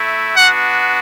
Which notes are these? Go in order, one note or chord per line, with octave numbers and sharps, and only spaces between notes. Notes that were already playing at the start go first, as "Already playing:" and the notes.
Already playing: A3 E4
B3 D4 F#4 F#5